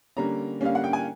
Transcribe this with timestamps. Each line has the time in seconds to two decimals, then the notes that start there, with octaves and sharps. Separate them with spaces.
0.17 D3 G3 A#3 C#4 A#5
0.61 D3 G3 A#3 C#4 F5
0.75 F#5
0.84 G5
0.93 G#5